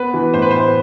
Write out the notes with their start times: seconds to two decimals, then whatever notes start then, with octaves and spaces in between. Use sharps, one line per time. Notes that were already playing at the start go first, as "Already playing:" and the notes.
Already playing: B3 B4
0.14 E3
0.34 A2 C5
0.42 B4
0.51 A2 C5